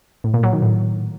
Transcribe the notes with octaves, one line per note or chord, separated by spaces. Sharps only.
A2
A#2
F#3
D#3
A2